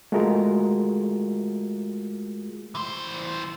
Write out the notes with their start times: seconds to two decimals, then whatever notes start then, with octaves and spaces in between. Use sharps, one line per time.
0.12 G#3 A3 F4 F#4 G#4 A#4
2.75 E3 C5